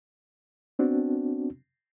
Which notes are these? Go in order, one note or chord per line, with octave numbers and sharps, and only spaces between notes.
B3 C4 D4 F#4